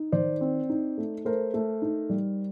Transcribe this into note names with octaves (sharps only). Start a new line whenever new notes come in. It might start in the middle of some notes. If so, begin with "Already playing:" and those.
Already playing: D#4
D#3 C5 D5
C4
D#4
A3
A3 A#4 C5
A3
D#4
G3